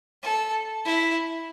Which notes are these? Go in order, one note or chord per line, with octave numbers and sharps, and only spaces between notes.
A4
E4